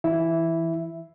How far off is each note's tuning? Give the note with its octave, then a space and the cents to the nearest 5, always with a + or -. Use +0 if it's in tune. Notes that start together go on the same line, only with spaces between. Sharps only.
E3 +0 E4 +0 E5 +0